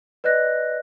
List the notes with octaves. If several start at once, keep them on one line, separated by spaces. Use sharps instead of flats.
B4 D5 D#5 F#6 A#6